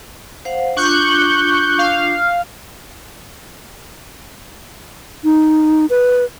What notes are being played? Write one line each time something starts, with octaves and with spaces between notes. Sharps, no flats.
C5 F5 F#5
D4 F4 C#6 D6 F#6 G6
F5
D#4
B4